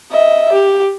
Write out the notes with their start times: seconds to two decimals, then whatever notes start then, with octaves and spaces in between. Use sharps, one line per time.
0.11 D#5 E5
0.52 G4